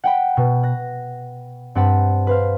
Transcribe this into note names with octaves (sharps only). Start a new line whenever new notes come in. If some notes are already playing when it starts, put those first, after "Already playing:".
F#5 G5 B5
B2
F#6 A#6
G2 C4 F#5 A5 B5
B4 C5 F5